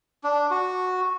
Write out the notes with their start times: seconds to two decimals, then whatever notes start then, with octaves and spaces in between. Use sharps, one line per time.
0.24 D4
0.51 F#4